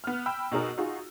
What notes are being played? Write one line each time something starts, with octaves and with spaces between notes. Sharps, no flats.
B3 F6
G5 B5 E6
B2 D#4 G#4 A#4
D#4 F4 F#4 G#4